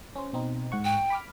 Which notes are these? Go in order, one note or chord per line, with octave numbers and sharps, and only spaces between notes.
C#4 C5
B2 C4 D#4
G#2 F#5 C#6
G5
B5 D6 F6